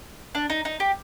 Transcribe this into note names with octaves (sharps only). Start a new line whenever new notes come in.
D4
D#4
D#4
G4